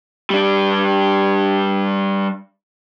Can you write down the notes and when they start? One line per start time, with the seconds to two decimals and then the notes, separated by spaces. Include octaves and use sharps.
0.30 G3 D4